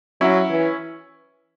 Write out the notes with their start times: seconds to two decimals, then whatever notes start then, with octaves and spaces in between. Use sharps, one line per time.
0.21 F#3 C#4 E4
0.50 E3